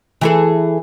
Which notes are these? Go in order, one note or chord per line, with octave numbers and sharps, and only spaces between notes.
E3 G#4 A4